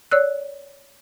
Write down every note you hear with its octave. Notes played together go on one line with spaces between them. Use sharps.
C#5 D5 E6 F#6